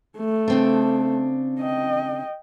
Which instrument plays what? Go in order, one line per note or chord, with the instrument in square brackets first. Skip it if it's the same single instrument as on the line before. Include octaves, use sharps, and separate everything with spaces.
[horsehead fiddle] A3
[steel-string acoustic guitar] C#3 C4 D4
[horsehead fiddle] D#5 G5